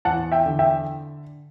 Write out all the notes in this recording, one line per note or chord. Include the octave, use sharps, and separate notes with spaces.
E2 F#5 A5
E5 G5
D3
E5 G5